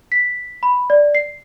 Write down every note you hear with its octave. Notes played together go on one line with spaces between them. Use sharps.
B6
B5
D5
C7